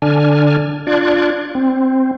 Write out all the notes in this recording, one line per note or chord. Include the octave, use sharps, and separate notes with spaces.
D3 D4 G#5 F6
D4 F4 D5 F#6 G#6
C4